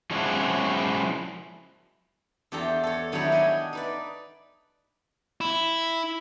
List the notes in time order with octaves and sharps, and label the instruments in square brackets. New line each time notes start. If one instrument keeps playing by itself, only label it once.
[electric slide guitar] F3 F#3 G#3 C#4 D4 E4
[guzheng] E2 D4 G4 A4 G5 A#5
A4 C#5
D#3 F#3 G3 D4 E4 C#5
D4 D#5 G5 G#5
D#4 B4 D5
[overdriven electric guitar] E4